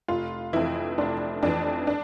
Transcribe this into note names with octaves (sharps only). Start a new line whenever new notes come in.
F1 F4
F2 E3 E4
F1 D4
F2 E3 D4
D4